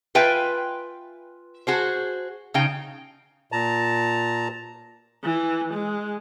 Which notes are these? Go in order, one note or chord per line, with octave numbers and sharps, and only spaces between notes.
F4 B4 E5 G5 G#5
F#4 G#4 C5
C#3 D#4 G5
A#2 A5 A#5
E3
G#3